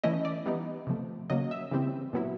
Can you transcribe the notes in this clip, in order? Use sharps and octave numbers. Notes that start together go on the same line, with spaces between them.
E3 A3 C#4 E4 D#5
D5
E3 G3 B3 D#4
C3 F3 A3
C#3 F#3 A#3 D#5
E5
C#3 E3 G3 C4
A#2 F#3 B3 E4